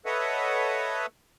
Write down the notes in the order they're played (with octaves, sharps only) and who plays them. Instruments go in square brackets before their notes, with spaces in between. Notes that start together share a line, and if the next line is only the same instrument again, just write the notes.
[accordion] A4 B4 C#5 D#5 E5 F#5